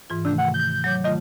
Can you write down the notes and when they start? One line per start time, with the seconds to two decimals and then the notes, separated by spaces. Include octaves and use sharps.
0.10 G#2 E3 F4
0.25 C3 D#3 A3 D4
0.38 F#5
0.54 G6
0.84 F#3 C#5 D6
1.04 D#3 A3 F4 D#5